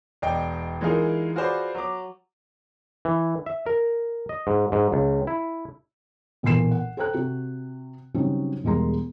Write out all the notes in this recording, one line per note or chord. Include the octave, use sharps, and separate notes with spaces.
E1 D5 D#5 G5
E3 G#3 D#4 F4 G#4 A#4
F4 F#4 G#4 B4 C5 D5
F#3 D6
E3
E5
A#4
D#5
G#2
G#2
C#2
E4
B1 A#2 E3 C6 C7 E7
F#5
A4 C5 G5 A#5 F#6
C3 F#4
C#3 F#3 G3 C4 C#4 D#4
E1 G3 G#3 A#3 A#5 C6